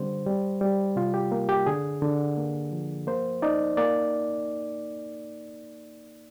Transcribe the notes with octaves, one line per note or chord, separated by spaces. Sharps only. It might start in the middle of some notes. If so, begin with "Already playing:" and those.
Already playing: D3 G3 C4 C5
G3
G3
C3 F4
G4
A#3
G4
D3 G#4
D3
A#3
F3
A#3 C5
D#4 D5
A#3 D5